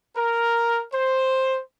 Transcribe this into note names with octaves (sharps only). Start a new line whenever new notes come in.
A#4
C5